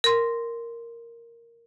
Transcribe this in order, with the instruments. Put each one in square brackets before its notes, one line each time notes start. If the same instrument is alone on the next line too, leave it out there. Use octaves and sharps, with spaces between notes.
[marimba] A#4 C6